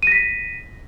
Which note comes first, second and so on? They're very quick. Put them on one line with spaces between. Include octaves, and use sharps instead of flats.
D#7 A#6 B6